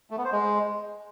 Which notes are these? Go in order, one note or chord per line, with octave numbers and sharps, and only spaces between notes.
A3
B3
C5
G#3